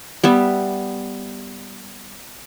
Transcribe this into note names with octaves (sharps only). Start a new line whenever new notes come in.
G3 B3 E5